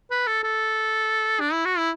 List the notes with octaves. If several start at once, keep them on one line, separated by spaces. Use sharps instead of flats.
B4
A4
A4
D4
E4
F#4
E4